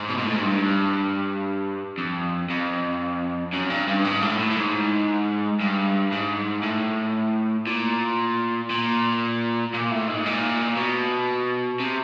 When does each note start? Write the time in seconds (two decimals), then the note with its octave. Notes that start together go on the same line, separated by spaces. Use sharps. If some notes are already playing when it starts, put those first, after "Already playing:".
Already playing: G#2
0.09 B2
0.18 A#2
0.25 A2
0.34 G#2
0.43 G2
1.98 F2
2.50 F2
3.53 F#2
3.70 G2
3.87 G2
4.04 G#2
4.22 A2
4.39 A2
4.51 A2
4.56 G#2
5.60 G2
6.12 G#2
6.63 A2
7.67 A#2
8.70 A#2
9.74 A#2
9.91 A2
10.08 G#2
10.26 A#2
10.77 B2
11.80 C3